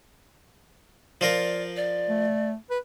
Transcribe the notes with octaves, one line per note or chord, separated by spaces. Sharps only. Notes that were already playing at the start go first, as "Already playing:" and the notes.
F3 F4 A#4 D5
D5
A3
B4